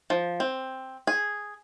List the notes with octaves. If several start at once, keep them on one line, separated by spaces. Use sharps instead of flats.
F3
C4
G#4